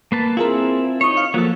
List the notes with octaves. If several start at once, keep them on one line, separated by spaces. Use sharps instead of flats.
A#3 B4 A5
C4 E4 F4 G#4 A#4
D#4 C#5 C#6 D#6
F5
F3 F#3 A#3 A4